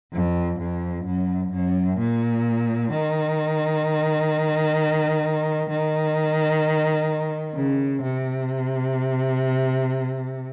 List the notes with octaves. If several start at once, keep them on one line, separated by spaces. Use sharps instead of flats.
F2
F2
F#2
F#2
A#2
D#3
D#3
C#3
C3